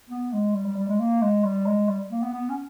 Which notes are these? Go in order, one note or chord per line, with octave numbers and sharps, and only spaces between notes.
B3
G#3
G3
G3
G3
G#3
A#3
G#3
G3
G#3
G3
A#3
B3
B3
C#4